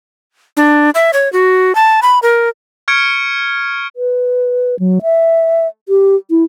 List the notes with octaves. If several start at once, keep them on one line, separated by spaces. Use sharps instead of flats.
D4
E5
C#5
F#4
A5
B5
A#4
C#6 F6 G#6 C#7 D7
B4
F#3
E5
G4
E4